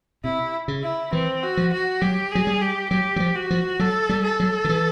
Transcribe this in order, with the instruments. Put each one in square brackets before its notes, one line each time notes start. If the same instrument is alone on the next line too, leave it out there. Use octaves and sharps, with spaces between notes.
[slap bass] C3 [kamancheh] E4
[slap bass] C#3
[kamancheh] E4
[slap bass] E3 [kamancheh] C4
[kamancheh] F#4
[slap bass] F3
[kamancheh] F#4
[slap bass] F#3 [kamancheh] G4
[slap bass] F#3 [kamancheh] G#4
[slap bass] G3
[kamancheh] G4
[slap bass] F#3 [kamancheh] G4
[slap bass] F#3
F3
[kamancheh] F#4
[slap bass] F3
[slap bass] F#3 [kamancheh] A4
[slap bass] G3
[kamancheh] A4
[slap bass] F#3
D#3
E3